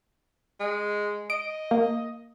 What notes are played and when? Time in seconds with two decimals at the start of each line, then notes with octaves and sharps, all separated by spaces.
0.60 G#3
1.30 D#5 D7
1.71 A#3